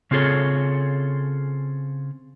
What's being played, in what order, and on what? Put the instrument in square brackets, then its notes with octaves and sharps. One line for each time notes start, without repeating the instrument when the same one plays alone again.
[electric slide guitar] C#3 C4 F4 G#4 A4 C#5